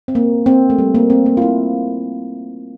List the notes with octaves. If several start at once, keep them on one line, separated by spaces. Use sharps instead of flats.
C4
A#3
C4
A3
G3
A#3
C4
A#3
F4
E4